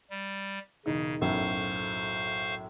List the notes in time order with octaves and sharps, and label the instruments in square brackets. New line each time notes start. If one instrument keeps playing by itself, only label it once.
[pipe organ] G3
[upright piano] E1 D#4 [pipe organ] C#3
[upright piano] B1 F#2 A2 [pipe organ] C5 F5 C#6